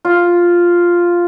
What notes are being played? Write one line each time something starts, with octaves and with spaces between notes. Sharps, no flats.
F4